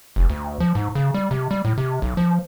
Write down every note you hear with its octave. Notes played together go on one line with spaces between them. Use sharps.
F1
D2
F3
G#2
C#3
G3
C3
G3
A2
C3
B1
F3